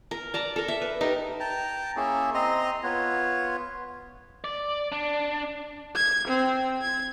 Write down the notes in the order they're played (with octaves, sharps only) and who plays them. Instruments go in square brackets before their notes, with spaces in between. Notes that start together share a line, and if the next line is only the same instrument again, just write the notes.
[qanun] A#4
D5 A5 A#5
A4 A#4
E5
B4
D#4 G4 A#4
[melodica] G5 A5 A#5
A#3 C#4 E4 G#4
C4 D#5 A#5 C6
B3 F4 C#5
[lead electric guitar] D5
D4
[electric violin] G#6
C4
G#6